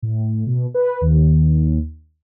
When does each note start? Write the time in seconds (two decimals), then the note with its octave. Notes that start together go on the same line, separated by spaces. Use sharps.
0.02 A2
0.46 B2
0.74 B4
1.01 D#2